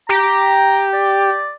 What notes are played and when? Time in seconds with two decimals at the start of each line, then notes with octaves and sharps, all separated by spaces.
0.09 G4 A#5
0.93 D5